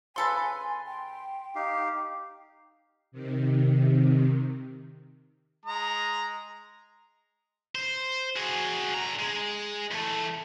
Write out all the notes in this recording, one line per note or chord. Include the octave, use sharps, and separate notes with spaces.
C#3 A4 B4 G#5 C6
G5
D#4 G4 F5
C3 D#3
G#3 A#5 D#6
C5
F#4 G#4
D3 A#5
G#3
E2 A3